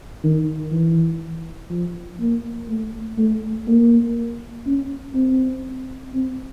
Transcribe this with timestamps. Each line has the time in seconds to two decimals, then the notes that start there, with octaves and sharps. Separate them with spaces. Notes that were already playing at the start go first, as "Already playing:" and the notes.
0.23 D#3
0.72 E3
1.70 F3
2.20 A#3
2.69 A3
3.18 A3
3.67 A#3
4.66 C#4
5.15 C4
6.14 C4